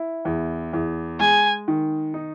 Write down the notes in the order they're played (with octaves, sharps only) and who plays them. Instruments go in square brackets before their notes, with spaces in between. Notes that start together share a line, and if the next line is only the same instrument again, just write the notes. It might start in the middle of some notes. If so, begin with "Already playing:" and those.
Already playing: [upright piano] E4
E2
E2
[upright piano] G#3 [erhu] G#5
[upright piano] D#3
D#4